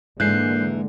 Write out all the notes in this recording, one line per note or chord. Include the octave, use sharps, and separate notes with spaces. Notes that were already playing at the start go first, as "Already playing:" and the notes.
G#2 D3 E3 G#3 A#3 F#6 G6 C7